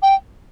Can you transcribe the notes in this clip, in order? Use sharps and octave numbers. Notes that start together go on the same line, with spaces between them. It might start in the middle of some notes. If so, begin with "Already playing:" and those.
G5